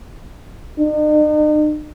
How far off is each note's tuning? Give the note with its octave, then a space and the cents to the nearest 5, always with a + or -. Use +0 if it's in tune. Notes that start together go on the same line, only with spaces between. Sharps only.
D#4 -45